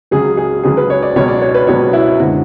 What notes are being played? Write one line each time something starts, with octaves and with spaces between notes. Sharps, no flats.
C#2 C#3 F#3 G#4
G#4
C#2 C#3 F#3 G#4
B4
C#5
D5
C#2 B2 F#3 C#5
D5
C#5
B4
C#2 B2 F#3 C#5
E4
F#1 D3 G#3 F#4